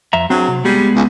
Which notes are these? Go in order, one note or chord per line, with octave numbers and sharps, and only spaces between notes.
F2 E5 A#5
F#3 C4 D4 G#4
C3
G3 G#3 B3 G#4
C#2